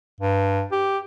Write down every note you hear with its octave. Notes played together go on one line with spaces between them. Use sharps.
G2
G4